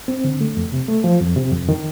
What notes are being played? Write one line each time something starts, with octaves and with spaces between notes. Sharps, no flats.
C4
D3
A3
F2
C3
A3
F3
F2
C3
F2
D#3